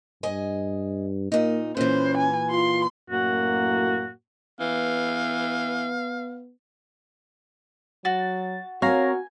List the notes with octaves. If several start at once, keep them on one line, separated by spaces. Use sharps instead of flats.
G2 D#5 G#5
A#2 A#3 D#4
A#2 E3 C#4 C5
G#5
F4 C6
F#2 A2 A#3 F#4
E3 B3 F5
F#3 F#4 A6
C4 F#4 A#4 C#5 F5 G#5 A#5